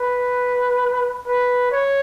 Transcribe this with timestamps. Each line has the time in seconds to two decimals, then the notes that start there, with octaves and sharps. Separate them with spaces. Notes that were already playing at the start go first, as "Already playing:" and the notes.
Already playing: B4
1.27 B4
1.72 C#5